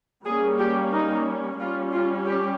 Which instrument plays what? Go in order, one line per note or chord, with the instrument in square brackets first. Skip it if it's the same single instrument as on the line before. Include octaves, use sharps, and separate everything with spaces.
[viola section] G3 A#3 C#4 G#4
G4
D#4
G3 C#4 F4
F4
G4